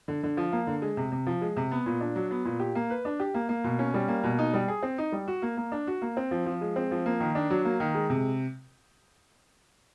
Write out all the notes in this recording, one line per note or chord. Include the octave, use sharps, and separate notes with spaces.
D3
D3
F3
A#3
D3
G#3
C3
C3
F3
G#3
C3
B3
A#2
D4
F#3
B3
A#2
G4
A#3
B4
D4
G4
A#3
A#3
B2
C#4
G3
A#3
B2
D#4
G3
G#4
C4
D#4
G3
F#4
A#3
A#3
D4
F#4
A#3
C4
F3
F3
G#3
C4
F3
A#3
D#3
D4
F#3
A#3
D#3
G#3
C3